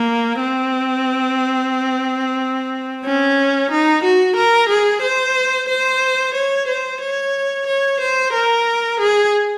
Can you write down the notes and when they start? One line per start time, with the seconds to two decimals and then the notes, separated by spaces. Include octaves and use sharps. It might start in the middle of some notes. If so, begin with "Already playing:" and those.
Already playing: A#3
0.40 C4
3.05 C#4
3.71 D#4
4.04 F#4
4.36 A#4
4.70 G#4
5.02 C5
5.68 C5
6.35 C#5
6.68 C5
7.01 C#5
7.67 C#5
8.00 C5
8.33 A#4
9.00 G#4